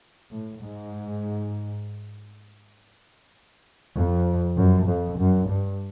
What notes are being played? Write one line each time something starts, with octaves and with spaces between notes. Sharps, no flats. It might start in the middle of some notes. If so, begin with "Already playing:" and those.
A2
G#2
F2
F#2
F2
F#2
G2